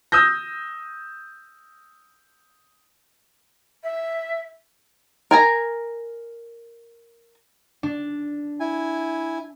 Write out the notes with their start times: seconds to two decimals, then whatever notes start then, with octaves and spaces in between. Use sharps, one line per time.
0.12 D#6 E6 G6 A#6
3.84 E5
5.31 A#4 G#5 A#5
7.83 D4
8.60 E4 G#5